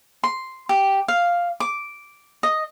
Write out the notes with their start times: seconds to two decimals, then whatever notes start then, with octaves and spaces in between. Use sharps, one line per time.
0.24 C6
0.69 G4
1.08 F5
1.60 D6
2.43 D#5